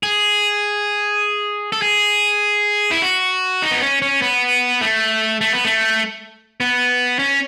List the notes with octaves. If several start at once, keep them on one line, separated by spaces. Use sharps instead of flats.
G#4
A4
G#4
E4
F#4
D#4
B3
C#4
C#4
B3
A3
A3
B3
A3
B3
C#4